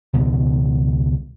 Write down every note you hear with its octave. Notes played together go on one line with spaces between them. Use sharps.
C#2 B2 D#3 G3